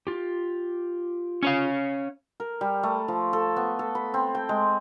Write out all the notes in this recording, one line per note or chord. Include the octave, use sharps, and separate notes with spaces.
F4 G4
C#4 C#5 F5
A#4
G3
A3
F3
A4
B3
A4
B5
C4
G5
G#3